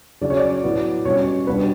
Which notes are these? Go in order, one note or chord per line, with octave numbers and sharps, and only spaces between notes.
C#3 F#3 C#4 D5
C#5
D5
A2 F#3 B3
B2 G3 C#4 C#5
B2 G3 B3 D4 B4